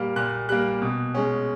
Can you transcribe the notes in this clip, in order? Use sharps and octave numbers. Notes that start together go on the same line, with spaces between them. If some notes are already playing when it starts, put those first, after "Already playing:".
Already playing: A#2 G3 A#3 F6
A#2 F#6
G3 A#3 F#6
B2
G#3 C#4